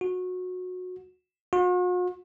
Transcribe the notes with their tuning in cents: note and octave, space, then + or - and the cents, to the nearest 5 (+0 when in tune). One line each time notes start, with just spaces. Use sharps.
F#4 -20
F#4 -45